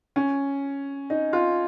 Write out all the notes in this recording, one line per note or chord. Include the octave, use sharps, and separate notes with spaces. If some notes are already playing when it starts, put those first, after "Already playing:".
C#4
D#4
F4